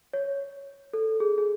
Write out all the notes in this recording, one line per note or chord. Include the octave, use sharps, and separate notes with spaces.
C#5
A4
G#4
G#4